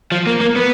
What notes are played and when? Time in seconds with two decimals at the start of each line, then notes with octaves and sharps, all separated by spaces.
0.12 F3
0.27 A#3
0.41 A#3
0.56 B3